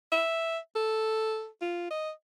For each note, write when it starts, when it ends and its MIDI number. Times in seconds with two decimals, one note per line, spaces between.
0.12 0.58 76
0.75 1.47 69
1.61 1.86 65
1.90 2.10 75